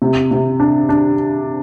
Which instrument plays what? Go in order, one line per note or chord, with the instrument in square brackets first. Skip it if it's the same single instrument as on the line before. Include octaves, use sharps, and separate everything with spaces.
[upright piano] C3
C3
D4
D4